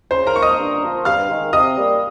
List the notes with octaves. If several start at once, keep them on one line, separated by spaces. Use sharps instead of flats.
C#3 C5 C6
A#4 A#5
F3 A#3 D#4 C#6
D#5 D#6
G2
F3 A#3
G2 F5 F6
D#3 G#3
C3 D#5 D#6
G3 A#3